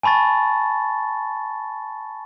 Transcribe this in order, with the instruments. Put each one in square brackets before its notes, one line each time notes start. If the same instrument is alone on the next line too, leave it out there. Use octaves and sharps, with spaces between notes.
[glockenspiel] G#5 A5 B5 C#6 A6